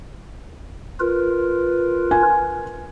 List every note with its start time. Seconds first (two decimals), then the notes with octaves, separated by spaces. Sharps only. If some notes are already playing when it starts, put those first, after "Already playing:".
1.00 F4 A#4 B4
2.11 G#5